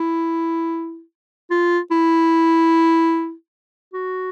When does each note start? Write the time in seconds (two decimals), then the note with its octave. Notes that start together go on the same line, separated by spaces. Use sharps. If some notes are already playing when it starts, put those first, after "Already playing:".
Already playing: E4
1.51 F4
1.91 E4
3.94 F#4